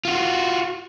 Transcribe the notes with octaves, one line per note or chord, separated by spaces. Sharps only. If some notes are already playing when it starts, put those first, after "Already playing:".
F4 F#4